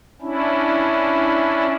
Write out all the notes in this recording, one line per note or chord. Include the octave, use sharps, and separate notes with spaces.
C#4 D4 E4